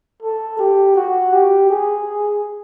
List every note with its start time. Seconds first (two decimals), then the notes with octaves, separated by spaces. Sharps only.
0.22 A4
0.59 G4
0.96 F#4
1.33 G4
1.70 G#4